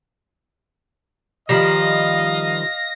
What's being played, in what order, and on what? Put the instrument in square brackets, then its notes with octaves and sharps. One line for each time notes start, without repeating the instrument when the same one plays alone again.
[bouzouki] D#3 F3 G3 [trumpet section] D#5 F5 [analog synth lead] A#6